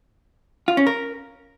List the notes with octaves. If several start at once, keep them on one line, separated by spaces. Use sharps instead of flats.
F4
C#4
A#4